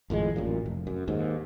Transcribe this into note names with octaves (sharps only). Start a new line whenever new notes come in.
G#1 F2 A2 G#3
A1 F#2 A#2
F1
F#2
D#2 G#2